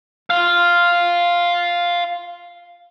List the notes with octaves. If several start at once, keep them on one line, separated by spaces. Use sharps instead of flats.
F4 F5